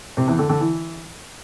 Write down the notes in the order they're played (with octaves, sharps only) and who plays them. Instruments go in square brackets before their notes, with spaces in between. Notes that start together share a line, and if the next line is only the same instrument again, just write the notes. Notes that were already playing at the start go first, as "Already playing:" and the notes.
[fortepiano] C3
E2
D3
D3
E3